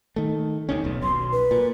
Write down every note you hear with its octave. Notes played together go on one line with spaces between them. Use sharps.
D#3 A3
D#2 D#3 C#4
D#1 B1
B1 C6
B4
A#2